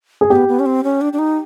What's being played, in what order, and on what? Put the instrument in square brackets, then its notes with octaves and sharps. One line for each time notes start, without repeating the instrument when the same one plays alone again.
[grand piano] G#4
[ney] B3 [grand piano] G4
[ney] B3
C#4
C4
C#4
D4
D4
D#4